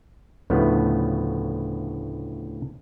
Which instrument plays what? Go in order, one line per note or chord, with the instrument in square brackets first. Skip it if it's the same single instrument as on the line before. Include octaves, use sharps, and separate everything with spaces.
[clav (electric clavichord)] D2 A2 C#3 F3 A3 B3